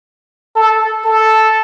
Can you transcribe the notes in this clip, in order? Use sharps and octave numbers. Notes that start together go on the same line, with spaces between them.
A4
A4